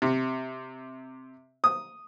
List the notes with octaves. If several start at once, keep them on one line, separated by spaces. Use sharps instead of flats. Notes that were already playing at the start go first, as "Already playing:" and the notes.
C3
D#6